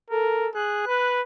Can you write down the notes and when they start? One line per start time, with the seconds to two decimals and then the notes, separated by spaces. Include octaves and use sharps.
0.10 A4 A#4
0.55 G#4 F#6
0.87 B4